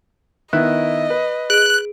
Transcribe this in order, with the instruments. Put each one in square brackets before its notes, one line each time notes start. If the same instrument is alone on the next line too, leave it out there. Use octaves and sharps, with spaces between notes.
[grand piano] D#3 B3 E4 [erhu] D#5 [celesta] F#6
[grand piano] B4
[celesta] G#4 D7 [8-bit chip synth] F#6